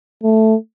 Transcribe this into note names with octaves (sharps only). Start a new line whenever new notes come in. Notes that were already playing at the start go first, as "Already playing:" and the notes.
A3